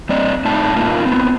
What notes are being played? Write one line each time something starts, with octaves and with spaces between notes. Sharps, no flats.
G3 C4 D5 D#5
A2 D#4 A5
A2 A#3 D#4 F4
B3 C4